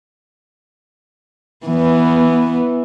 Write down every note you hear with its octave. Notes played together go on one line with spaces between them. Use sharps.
E3 B3